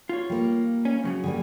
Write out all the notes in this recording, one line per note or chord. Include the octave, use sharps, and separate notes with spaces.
F4 C#5
G3 A#3
C#4
F#2 C#3 F#3
D3 G3 A#3 G#4